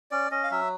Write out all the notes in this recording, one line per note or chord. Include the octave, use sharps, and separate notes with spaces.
C#4 D5
C#4 D#5
F5
F#3 E5